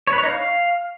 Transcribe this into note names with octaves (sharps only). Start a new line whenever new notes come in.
C#5
B4
C#5
D#4
F5